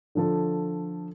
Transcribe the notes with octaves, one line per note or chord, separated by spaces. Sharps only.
D3 F3 A4